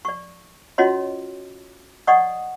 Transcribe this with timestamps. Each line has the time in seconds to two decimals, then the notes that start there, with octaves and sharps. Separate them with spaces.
0.05 D5 C#6
0.78 C#4 F4 F#4 C#5 D#5 C6
2.07 D5 D#5 F#5 C#6 D#6